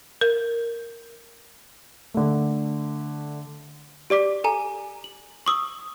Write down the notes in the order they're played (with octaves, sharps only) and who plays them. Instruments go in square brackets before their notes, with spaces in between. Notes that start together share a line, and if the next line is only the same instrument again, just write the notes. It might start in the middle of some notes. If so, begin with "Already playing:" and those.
[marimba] A#4
[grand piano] D3 A3
[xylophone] G4 D5 D6 B6
A4 G#5 A#5
F#7
C#6 D#6 E6